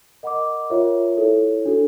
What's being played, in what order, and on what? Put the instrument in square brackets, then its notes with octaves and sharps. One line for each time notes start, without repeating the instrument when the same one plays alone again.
[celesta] A#4 D#5 F#5 B5 D6
F4 A#4 C#5 E5
E4 A4 C#5
D4 F#4 A4